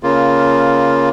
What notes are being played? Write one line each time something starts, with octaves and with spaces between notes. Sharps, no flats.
C#3 A#3 F4